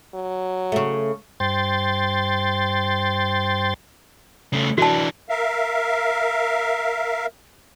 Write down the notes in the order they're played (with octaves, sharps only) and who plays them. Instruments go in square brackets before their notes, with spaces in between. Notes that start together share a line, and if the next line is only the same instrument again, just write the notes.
[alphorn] F#3
[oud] C#3 A3
[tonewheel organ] G2 C5 G5 C6 A6
[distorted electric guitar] C#3 A3
[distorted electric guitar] E3 D4 [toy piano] F#4 A5
[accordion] A#4 E5 F5